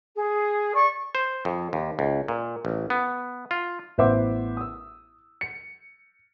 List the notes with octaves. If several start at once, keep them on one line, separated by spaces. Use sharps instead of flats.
G#4
D5 C#6
C5
F2
D#2
C#2
A#2
A1
B3
F4
A1 B3 C5 E5 F#5 D6
D#6 E6
C#7